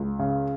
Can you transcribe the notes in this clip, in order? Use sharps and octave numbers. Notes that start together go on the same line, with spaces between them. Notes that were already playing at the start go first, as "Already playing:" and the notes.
Already playing: C#2
C#3